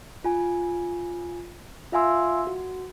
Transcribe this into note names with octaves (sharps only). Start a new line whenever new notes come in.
F4 G#5
F4 E5 F5 G#5 C6 E6
F#4